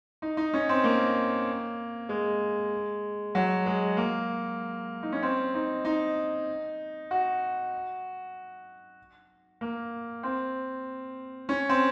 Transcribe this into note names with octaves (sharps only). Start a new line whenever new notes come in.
D#4
D#4
C#4
C4
A#3
G#3
F#3
G#3
A#3
D#4
C#4
C4
D#4
D#4
F#4
A#3
C4
C#4
C4